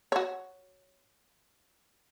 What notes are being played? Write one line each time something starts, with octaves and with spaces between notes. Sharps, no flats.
F#4 C#5